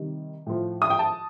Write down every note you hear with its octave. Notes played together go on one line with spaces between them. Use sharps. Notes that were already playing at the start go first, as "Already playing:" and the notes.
Already playing: C3 D#3 G3
A2 F3
D#6
G5
A5